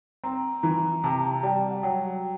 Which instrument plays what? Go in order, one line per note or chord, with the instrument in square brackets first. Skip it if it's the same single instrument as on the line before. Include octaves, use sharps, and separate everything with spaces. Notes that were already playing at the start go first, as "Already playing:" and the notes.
[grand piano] C4 [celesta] A#5
[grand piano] E3 [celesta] A#5
[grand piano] C3 [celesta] A5
[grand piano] G3 [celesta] G5
[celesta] F#5
[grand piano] F#3 [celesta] G5